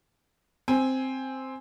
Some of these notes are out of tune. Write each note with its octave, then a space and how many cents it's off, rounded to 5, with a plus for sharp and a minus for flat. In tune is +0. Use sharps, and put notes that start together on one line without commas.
C4 +0 G#5 +0